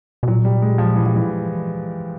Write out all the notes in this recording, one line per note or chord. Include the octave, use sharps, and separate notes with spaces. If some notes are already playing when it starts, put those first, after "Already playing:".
B2
A#2 F#3
G3
G#3
F3
E3
F3
E3